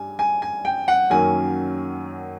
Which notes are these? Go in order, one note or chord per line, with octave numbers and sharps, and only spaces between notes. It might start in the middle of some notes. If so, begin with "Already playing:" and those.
Already playing: G2 G3 G#5
G#5
G#5
G5
F#5
F#2 D#3 F#3 A#3 C#4 G#5